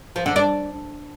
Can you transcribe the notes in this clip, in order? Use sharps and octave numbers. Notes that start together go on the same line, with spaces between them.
F3
D3
D4